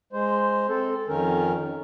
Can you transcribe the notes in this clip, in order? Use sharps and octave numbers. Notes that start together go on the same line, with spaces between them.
G#3 C5
C4 A4
F2 D#3 C#4 A#4